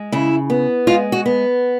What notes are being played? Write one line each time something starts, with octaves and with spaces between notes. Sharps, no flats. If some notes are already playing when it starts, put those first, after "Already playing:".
Already playing: G#3
C#3 E4
B3
G#3 F4
F#4
B3